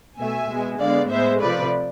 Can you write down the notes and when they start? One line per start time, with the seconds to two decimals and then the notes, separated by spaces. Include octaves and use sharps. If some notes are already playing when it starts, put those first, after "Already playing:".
0.18 B2 A3 E5 G#5
0.50 B2 G#3 B3
0.79 D3 G#3 B3 D5 F5
1.10 A2 G#3 B3 C5 E5
1.41 C3 F3 A3 B4 D5